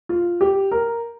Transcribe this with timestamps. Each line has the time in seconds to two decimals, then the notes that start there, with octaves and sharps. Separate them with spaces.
0.09 F4
0.41 G4
0.71 A#4